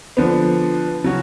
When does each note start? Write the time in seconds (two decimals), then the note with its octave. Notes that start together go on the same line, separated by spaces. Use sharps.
0.17 D3 F3 B3
1.04 C#3 F#3 C#4 F#4